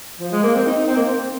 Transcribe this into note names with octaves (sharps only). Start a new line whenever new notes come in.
F3
G#3
A#3
C4
D#4
D#4
C4
A#3
C4